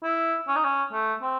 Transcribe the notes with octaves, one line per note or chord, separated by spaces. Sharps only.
E4
C#4
D#4
C#4
A3
C4